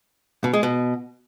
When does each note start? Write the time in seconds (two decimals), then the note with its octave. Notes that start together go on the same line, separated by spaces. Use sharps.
0.44 B2
0.53 G#3
0.63 B2